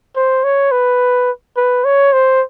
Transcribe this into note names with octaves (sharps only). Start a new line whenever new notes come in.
C5
C#5
B4
B4
C#5
C5